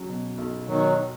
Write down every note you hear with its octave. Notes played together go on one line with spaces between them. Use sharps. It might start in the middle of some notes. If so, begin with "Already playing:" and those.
Already playing: F#3 C#4
B2
B1
B2 D#3 F#3